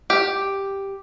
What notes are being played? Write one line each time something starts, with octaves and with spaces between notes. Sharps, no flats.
G4